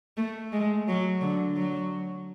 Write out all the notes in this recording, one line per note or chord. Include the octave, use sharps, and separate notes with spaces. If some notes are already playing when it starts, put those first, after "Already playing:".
A3
G#3
F#3
D3
F#3